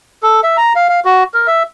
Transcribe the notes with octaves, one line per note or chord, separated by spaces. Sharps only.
A4
E5
A#5
F5
F5
F#4
A#4
E5